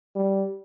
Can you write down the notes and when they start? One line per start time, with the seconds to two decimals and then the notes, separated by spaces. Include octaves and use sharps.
0.15 G3